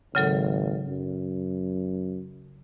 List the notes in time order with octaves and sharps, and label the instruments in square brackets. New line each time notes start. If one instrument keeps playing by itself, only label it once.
[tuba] G#1 [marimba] C#3 F#3 A4
[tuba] F#2